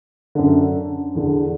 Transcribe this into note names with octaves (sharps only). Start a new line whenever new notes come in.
F#2 D3
E2 D3